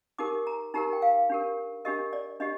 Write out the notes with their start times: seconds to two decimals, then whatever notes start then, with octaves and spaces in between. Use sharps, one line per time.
0.19 D#4 G4 A#4 D6
0.47 A#5
0.74 D#4 G4 A#4 A#5
0.93 G5
1.02 F5
1.30 D4 G4 A#4
1.85 D4 G4 A#4 D#5
2.13 D5
2.40 D4 G4 D#5